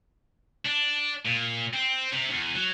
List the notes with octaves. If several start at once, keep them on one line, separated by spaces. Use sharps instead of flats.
D4
A#2
C4
C3
E2
F#3